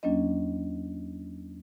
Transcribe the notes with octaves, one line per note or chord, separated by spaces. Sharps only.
E2 F#3 A#3 C#4 D4 D#5